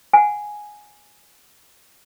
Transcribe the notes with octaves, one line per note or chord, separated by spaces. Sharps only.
F#5 G#5